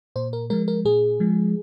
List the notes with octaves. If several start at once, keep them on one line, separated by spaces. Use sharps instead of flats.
A#2 C5
A#4
F3 G#3 A#4
A#4
A#2 G#4
F3 G#3